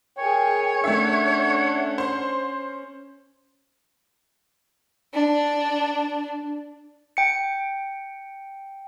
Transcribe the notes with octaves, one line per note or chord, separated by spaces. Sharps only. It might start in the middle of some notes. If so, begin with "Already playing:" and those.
G#4 A#4 C#5 G5 G#5
A3 C#4 D4 E5 F#5
C5
D4
G5 C#7